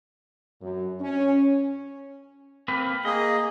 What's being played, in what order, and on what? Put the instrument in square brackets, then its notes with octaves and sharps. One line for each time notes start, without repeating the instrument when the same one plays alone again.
[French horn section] F#2
C#4
[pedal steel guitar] A#3 C4 B4
[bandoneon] A#3 G#4 [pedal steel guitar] D#5